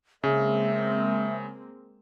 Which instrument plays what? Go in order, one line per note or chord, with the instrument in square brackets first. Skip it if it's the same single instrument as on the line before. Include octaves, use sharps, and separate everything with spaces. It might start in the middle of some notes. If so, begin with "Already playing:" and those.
[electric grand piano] C#3 [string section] G#3 A#3 C4 [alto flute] E5